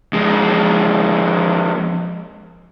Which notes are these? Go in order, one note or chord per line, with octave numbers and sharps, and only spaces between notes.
F2 G#3